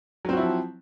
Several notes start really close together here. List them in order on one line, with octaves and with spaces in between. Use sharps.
F#3 C4 F#4 E4 F3